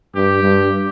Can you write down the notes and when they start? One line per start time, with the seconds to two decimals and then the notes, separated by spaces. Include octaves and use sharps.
0.15 G2 G4
0.43 G2